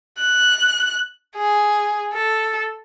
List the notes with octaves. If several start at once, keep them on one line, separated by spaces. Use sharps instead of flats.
F#6
G#4
A4